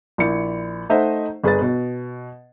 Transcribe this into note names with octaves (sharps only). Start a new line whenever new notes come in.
A#1 E4 C#7
A3 D#4 C5 D#5 E5 F#5
G1 G#4 B4 A6
B2